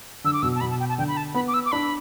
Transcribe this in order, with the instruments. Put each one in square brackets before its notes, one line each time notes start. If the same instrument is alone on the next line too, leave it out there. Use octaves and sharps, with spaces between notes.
[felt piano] D3 [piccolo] E6
[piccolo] D6
[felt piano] B2 [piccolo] E6
[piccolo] A5
[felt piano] B2 [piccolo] B5
[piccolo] A5
G5
A5
[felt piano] D3 [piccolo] G5
[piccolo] B5
A5
[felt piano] B3 [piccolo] B5
[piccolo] D6
E6
D6
[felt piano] D4 [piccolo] B5